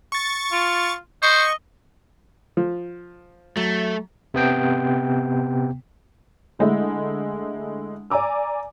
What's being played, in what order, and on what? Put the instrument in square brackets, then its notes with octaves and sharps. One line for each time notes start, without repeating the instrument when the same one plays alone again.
[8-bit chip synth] C#6 A6
[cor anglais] F4
[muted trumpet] C5 [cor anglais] D#5 [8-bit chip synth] C#6
[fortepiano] F3
[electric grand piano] F#3 [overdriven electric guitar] A3
[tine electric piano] C3 B3 G5
[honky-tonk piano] D3 G#3 A3 E4
D5 G#5 A#5 D6 E6